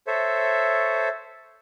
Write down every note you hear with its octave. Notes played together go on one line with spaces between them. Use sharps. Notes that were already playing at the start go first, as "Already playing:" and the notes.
A4 C5 C#5 E5